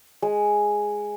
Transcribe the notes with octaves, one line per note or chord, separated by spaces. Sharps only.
G#3